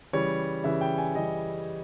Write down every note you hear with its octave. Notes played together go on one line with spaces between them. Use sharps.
C#3 E3 G3 C#5
C#3 E3 G3 E5
G5
G#5
C#3 E3 G3 D#5